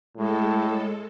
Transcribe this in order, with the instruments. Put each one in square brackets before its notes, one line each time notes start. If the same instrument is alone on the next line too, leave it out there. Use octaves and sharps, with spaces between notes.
[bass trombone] A2 [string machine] G#3 A4